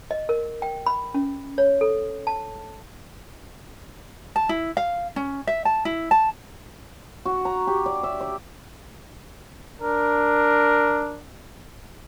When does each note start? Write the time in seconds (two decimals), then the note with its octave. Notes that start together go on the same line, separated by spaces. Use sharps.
0.11 D#5
0.29 A#4
0.62 G5
0.86 B5
1.14 C#4
1.58 C#5
1.81 A4
2.27 A5
4.36 A5
4.49 E4
4.77 F5
5.16 C#4
5.47 E5
5.65 A5
5.85 E4
6.11 A5
7.26 F#4
7.45 A#5
7.67 G4
7.86 D5
8.03 E5
8.21 D5
9.81 D4 A#4